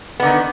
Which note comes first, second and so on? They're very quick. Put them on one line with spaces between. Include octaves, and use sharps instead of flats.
B3 D3 D#3